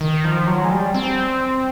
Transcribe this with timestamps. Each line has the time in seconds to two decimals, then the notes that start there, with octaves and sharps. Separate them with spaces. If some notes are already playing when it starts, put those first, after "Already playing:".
0.01 D#3
0.24 F3
0.47 F#3
0.65 G#3
0.71 G3
0.94 C4